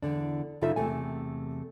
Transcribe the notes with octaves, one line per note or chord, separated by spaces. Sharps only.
E2 G#2 D3 D4
F#2 C#3 D#4 F4 A4 E5
E2 C3 A3 G#5